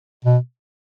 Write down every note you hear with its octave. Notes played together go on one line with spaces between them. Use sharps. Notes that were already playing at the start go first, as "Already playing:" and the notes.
B2